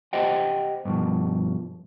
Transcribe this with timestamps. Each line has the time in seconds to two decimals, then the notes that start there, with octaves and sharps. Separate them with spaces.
0.13 G4 C5 D#5 F#5 G5
0.85 G2 B2 D3 F3